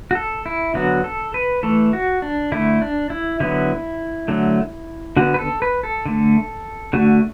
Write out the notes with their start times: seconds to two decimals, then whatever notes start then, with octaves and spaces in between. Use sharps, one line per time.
0.11 F#4
0.15 A4
0.46 E4
0.74 D3 F#3 B3 F#4
1.04 A4
1.34 B4
1.63 E3 A3 A4
1.93 F#4
2.22 D4
2.52 D3 A3 E4
2.82 D4
3.10 E4
3.40 D3 F#3 B3 E4
4.28 D3 F#3 A3
5.17 D3 B3 F#4
5.34 B4
5.39 A4
5.62 B4
5.83 A4
6.06 D3 A3
6.93 D3 A3 F#4